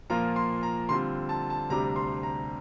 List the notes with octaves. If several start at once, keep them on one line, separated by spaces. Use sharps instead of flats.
A#2 F3 A#3 F4 A#5
C6
A#5
D3 G3 C4 F4 C6
A5
A5
D2 C3 G3 D4 A#5
C6
A#5